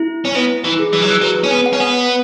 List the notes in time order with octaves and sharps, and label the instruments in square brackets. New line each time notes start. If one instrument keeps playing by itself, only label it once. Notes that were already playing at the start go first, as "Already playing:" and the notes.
Already playing: [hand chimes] E4
[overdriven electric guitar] C#4
[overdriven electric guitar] B3 [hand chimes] E4
[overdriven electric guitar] E3
[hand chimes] G#4
[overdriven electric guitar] E3
F#3
E3
[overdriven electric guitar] F#3 [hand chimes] B4
[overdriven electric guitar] C#4
B3
[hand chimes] F#5
[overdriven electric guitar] C#4
B3